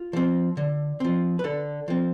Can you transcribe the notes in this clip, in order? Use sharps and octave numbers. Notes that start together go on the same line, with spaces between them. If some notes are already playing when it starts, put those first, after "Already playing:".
Already playing: F4
F3 C4
D3
F3 C4
B4
D3 A4
F3 C4